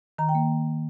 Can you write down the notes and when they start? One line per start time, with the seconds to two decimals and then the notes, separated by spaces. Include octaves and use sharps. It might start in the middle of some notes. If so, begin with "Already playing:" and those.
0.18 D#3 A#5
0.29 G5
0.35 A#3